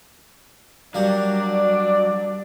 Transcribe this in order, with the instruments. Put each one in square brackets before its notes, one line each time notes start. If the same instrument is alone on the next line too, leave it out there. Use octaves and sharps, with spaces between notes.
[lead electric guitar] F#3 [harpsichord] G3 A#3 [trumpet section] D4 D5